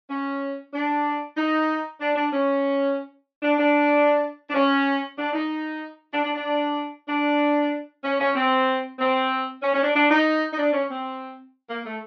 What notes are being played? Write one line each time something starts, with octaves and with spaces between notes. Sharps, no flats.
C#4
D4
D#4
D4
D4
C#4
D4
D4
D4
C#4
D4
D#4
D4
D4
D4
D4
C#4
C#4
C4
C4
C#4
C#4
D4
D4
D#4
D#4
D4
C#4
C4
A#3
A3